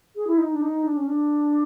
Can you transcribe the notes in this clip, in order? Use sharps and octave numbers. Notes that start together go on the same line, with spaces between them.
G#4
E4
D#4
D4
D#4
D4
C#4
D4